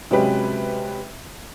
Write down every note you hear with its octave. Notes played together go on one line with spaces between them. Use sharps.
C3 F#3 G#3 C#4 G4 B4